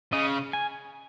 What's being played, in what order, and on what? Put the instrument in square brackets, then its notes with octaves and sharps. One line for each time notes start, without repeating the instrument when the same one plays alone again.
[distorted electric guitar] C#3 [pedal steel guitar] D#5
[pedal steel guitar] G#5